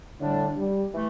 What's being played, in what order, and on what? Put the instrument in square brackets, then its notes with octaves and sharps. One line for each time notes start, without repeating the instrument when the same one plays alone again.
[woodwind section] A2 G3 D4 [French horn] D3
[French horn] G3
[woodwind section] E3 A3